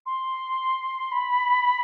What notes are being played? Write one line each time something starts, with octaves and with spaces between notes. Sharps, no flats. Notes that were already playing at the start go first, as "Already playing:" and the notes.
C6
B5